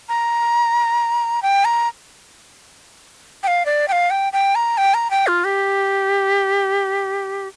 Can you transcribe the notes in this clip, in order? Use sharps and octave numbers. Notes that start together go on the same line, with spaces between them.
A#5
G5
A#5
G5
F5
D5
G5
F5
G5
G5
A#5
G5
A#5
G5
F4
G4